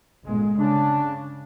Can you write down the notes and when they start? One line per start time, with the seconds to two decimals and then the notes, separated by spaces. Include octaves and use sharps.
0.24 G1 A#2 G#3
0.58 C#3 D4